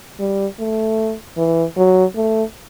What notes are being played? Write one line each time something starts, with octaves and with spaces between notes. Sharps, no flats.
G3
A3
E3
F#3
A3